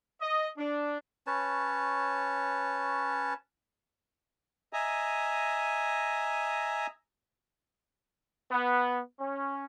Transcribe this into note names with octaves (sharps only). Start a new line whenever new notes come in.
D#5
D4
C#4 B4 C#5 A5
D#5 E5 G#5 A#5
B3
C#4